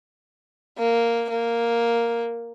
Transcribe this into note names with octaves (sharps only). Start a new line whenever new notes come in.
A#3
A#3